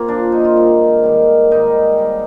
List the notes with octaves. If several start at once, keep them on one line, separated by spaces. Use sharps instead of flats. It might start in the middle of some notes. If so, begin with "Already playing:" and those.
Already playing: A#3 C4 F4
A#2 F3 D4
D#4
F4
G#2 D#3 G3
G#2 D#3 G3
G#2 D#3 G3 D#4
G#2 D#3 G3